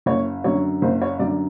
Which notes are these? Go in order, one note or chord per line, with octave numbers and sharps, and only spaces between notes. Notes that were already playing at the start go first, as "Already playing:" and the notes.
F#1 C#5
F#2 D3 C#5
F#1 C5
C#5
F#2 D3 D5